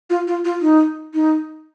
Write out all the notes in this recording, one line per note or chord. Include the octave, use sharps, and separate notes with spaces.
F4
F4
F4
D#4
D#4